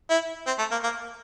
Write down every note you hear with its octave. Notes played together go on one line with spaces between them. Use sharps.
E4
C4
A3
A#3
A#3